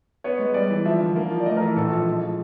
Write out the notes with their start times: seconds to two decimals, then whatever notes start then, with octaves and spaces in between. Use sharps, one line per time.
0.24 B3 C#5
0.39 G#3
0.54 G3 D5
0.70 E3
0.85 F3 E5
1.01 D3
1.16 A#3
1.31 F3
1.40 D5
1.46 A3 D#5
1.57 A#4
1.61 E3
1.66 A4
1.76 A#1 A4
1.92 F3
2.07 G#3
2.23 F3